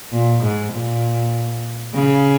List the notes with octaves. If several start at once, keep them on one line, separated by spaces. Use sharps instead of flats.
A#2
G#2
A#2
C#3